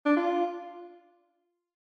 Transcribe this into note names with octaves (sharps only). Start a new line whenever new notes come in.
D4
F4